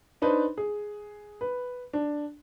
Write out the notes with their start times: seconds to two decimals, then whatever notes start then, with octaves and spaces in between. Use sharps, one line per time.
0.22 D4 D#4 B4 C5
0.58 G#4
1.41 B4
1.93 D4